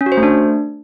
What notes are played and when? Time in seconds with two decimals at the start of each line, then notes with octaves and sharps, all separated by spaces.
0.01 C#4
0.06 F#4
0.12 C5
0.17 A3
0.23 D4